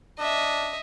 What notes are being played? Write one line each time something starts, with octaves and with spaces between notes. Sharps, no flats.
D4 D#5 E5